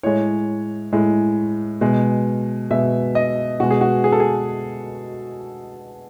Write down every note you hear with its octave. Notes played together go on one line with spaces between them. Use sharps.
A2 G#3 C#5
A2 G#3
B2 G#3
B2 G#3 E5
D#5
B2 G#3 F#4
G#4
F#4
G#4
A4
G#4